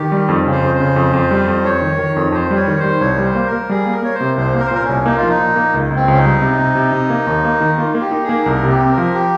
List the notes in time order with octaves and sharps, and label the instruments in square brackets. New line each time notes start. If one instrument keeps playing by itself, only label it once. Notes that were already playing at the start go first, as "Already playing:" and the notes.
Already playing: [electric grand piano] D#3 [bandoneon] G4
[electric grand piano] G3
F2
C#3
[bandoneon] C5
[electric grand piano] F2
[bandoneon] C5
[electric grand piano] C#3
F2
F2
G3
F2
[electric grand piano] F2 [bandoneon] C#5
[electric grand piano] D#3
D#3
F2
[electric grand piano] F2 [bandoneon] C5
[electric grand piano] G3 [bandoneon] C#5
[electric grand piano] D#3
[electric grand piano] G3 [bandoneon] C5
[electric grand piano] C2 [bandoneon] C#5
[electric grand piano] G3
[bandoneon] C5
[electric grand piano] A#3
[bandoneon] A#4
[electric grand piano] A#3
[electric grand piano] G3 [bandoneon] G#4
[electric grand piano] A#3
[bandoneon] A#4
[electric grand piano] A#3 [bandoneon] C#5
[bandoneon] C5
[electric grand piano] C3
[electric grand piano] C2 [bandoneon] C5
[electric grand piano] A#3
[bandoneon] A#4
C5
[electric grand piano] A#2 [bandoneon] A#4
[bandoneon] C#4
[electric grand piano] C2
[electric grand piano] A#3 [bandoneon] D#4
[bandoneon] F4
[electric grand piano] F3
[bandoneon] D#4
[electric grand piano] A#2
A#3
C#2
C#2
[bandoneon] C4
[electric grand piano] C#2
[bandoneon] C#4
D#4
[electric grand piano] G3
C3
C3
C3
C3
A#3
D#2
A#3
D#3
[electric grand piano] A#3 [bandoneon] F4
[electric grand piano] A#3
[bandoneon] G4
[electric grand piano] D#4
[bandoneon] G#4
[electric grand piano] A#3
[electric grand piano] C2 [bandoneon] A#4
[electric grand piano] C3
[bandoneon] G4
[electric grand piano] C4
[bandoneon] A#4
[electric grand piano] F3
[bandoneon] G4